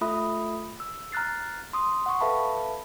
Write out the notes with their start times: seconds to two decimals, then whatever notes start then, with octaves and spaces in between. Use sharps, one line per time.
0.01 A3 F4 A4 E5 B5 D#6
0.80 E6
1.12 A#5 F6 F#6 A6 C7
1.73 C6 D#6
2.06 F#5 C#6
2.20 A4 B4 E5 F5 A5 B5